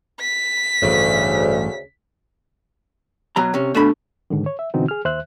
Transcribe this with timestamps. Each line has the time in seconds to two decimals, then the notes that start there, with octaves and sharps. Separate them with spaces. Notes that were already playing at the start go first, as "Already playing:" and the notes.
0.20 B6
0.82 A1 D2 G2 C#3
3.36 B2 F#3 A#5
3.54 C3 C#4
3.75 B2 A3 D4 A4 B5 C#6
4.30 G#2 D3 D#3
4.46 C#5
4.59 E5
4.74 B2 D3 E3 C4 D#4 F#4
4.88 G#4 F6
5.05 D#2 C5 E5 F#6